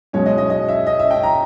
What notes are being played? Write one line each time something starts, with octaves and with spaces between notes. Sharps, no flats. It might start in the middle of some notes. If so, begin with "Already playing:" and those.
B1 B2 G#3 C#4 C#5
D#5
D#5
D#5
E5
D#5
E5
G5
A#5